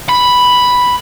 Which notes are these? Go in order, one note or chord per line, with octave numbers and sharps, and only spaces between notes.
B5